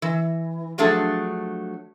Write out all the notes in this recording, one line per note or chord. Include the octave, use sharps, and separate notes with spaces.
E3
F3 F#3 A3 D4 G#4